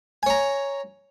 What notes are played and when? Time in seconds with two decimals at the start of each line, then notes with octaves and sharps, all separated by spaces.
0.23 G#5
0.26 C#5
0.30 A#5